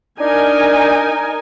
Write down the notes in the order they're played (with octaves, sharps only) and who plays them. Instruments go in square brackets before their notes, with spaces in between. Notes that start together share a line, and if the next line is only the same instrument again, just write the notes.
[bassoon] D4 [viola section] D#4 A#4 G#5